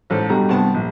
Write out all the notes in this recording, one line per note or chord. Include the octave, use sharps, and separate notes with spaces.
A1 G#2 A4 C5
G2 B2 G3 A3 A#5
C2 G2 B3 A5
A#1